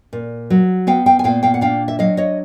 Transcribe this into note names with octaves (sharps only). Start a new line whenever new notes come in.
A#2
F#3
B3 F5 G5
F5 G5
G#5
A#2 F5 G5
F5 G5
F#5
D4 F5 G5
E5
F#3 D#5 F5
C#5 D#5